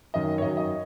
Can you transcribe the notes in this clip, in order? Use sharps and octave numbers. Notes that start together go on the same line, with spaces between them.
F#2 D#3 F#3 D#5
C#5
F#2 D#3 F#3 D#5
D#5